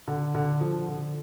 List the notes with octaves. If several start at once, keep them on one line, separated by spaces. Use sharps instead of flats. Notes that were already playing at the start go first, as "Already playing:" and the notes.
D3
D3
F3
D3